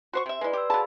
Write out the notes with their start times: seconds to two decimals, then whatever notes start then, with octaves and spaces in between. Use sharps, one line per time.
0.13 F#4 C5 C6 C#6
0.26 C3 E5
0.41 G#3 E4 B4 D5
0.53 G4 C6 E6
0.70 F#3 G#4 F5 A5 B5